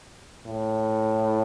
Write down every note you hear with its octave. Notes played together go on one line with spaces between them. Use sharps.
A2